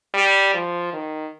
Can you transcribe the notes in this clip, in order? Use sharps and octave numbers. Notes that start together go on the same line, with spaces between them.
G3
F3
D#3